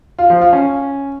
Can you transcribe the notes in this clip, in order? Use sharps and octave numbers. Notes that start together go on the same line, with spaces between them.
F4
F3
F4
C#4